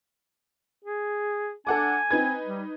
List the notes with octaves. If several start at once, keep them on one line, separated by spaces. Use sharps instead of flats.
G#4
D4 A4 F#5 G#5 D6
C4 D#4 B4 G#6
G3